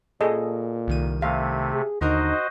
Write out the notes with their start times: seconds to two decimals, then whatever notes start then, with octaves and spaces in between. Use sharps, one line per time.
0.21 A#2 G#4 A4 D#5
0.88 C2 D#3 D#7
1.22 C3 A3 F5
1.73 G#4
2.01 D#2 D3 D#4 F#4 A#4 C5 D#5